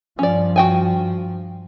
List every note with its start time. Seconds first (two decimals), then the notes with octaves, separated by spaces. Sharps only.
0.19 G2 F3 C#4 D5
0.56 F#4 G5 G#5